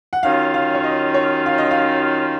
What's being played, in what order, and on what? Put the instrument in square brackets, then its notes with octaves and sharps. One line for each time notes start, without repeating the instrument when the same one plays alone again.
[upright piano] F#5
[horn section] D#3 F#3 C#4 F4 [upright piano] F5
[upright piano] F5
C#5
D#5
C#5
F5
D#5
F5